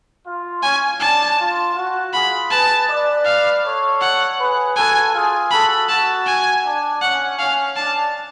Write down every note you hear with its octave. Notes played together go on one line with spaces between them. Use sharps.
F4
C#4 G#5
D4 A5
F4
F#4
F4 G#4 B5
G#4 B4 A5
B4 D5
F5
A4 C#5
F#5
G#4 B4
F#4 A4 G#5
F4 G#4
F#4 A4 B5
F#4 A5
G#5
D4
C#4 F#5
C#4 F5
D4 A5